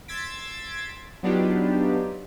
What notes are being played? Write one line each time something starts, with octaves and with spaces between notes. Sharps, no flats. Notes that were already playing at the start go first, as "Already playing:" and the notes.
C6 E6 G#6 A6 B6 D7
F#3 B3 D4 D#4 F4 G4